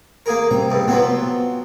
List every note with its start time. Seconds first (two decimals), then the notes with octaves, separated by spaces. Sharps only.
0.26 A#3 G#4 A#4
0.51 C3 G3 C4 A#5
0.71 C#2 G2
0.88 F3 F#3 B3 C4